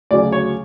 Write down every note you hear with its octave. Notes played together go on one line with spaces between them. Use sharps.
D2 C#3 F#3 C#4 D5
C#5